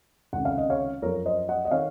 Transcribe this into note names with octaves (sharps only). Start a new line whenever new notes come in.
C#2 C3 D#3 F#5
F5
D#5
C#5 F5
F#2 F3 A#4 C#5
C5 D#5
D#5 F#5
D#5
D#3 C#5 F5